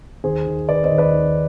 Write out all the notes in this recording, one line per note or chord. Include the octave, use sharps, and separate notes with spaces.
D#2 G#4 C5
D#3
D#3 B4 D5
C5 D#5
D#2
B4 D5
D#2